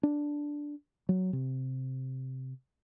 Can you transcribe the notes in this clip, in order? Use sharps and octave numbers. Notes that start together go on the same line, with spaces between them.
D4
F#3
C3